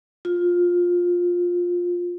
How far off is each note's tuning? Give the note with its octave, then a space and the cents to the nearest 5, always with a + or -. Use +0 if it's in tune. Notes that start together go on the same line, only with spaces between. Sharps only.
F4 +15